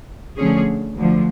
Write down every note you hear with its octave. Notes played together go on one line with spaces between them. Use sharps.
D3 F3 A3 C#4 G#4
D2 D3 F3